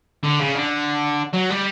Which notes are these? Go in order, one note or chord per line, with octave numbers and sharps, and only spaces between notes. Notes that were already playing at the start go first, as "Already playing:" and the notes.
D3
C#3
D3
F#3
G3